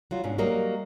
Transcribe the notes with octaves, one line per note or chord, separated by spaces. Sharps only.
F#3 G3 F4
G#2 B2 C#4 D4
F#3 G3 A#3 A#4 D#5